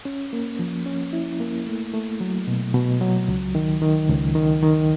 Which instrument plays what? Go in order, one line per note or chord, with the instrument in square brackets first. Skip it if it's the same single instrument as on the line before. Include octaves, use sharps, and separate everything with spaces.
[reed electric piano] C#4
A#3
F3
C#4
E4
A#3
A3
A3
F#3
B2
B2
F#3
C#2
D#3
D#3
C#2
D#3
D#3